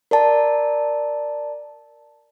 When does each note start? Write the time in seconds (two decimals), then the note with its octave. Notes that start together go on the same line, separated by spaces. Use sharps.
0.11 A#4 D5 A5